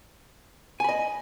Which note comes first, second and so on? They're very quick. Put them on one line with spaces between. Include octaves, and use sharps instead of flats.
G#5 B5 D#5